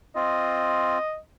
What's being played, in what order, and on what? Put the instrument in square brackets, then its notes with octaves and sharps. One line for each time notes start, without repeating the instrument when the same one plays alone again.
[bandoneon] C4 F4 [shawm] D#5